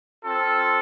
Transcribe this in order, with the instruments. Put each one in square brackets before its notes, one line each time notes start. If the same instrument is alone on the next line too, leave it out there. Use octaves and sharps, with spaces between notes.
[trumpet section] C4 F4 A4